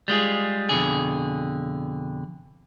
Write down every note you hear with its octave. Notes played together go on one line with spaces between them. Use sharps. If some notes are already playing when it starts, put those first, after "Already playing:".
G3 G#3 F4 G#4
F2 B2 D3 G#4